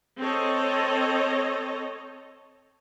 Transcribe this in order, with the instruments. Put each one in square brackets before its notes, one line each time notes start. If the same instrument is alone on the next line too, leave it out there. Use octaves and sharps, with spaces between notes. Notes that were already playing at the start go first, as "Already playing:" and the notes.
[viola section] C4 A4 C#5 D#5